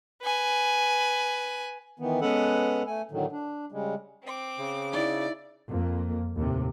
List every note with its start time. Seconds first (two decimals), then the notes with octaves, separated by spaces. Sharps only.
0.22 B4 G#5
1.99 D#3 E3 B3
2.21 G#3 B3 C#4 A4 B4 F#5
2.87 A3 G#5
3.11 A2 D3 D#3 F#3
3.32 D4
3.72 C#3 G3 G#3
4.26 C4 D6
4.58 C#3
4.93 D#4 E4 D5
5.67 F2 A#3
6.36 D#2 A2 C3